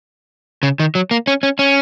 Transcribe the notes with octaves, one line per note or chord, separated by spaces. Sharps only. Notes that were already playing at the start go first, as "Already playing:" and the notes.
C#3
D#3
F#3
A#3
C#4
C#4
C#4